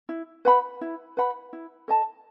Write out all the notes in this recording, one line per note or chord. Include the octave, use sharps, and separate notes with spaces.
E4
B4 F#5 B5
E4
B4 F#5 B5
E4
A4 D#5 A5